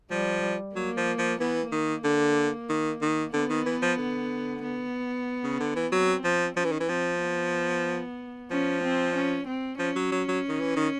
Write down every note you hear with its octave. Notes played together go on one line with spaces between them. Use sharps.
F3 G3
F#3 A#3
F3
F3
E3 B3
D#3 A#3
D3
D#3
D#3
D3 B3
D#3
E3
F3
D3
B3
C#3
D3
E3
F#3 C4
F3
F3 C#4
E3
D#3
E3
F3 C4
B3
F3 C#4
C4
C#4
C4
F3 C#4
F#3
F#3
F#3
D#3
E3
D#3